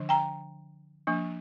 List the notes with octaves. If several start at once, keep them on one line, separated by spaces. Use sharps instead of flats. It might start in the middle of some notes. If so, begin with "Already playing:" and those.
Already playing: D3 F3 D4
G5 A#5
F3 A#3 D4